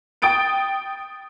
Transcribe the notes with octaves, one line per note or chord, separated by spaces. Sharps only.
G5 D#6 A6 D7 D#7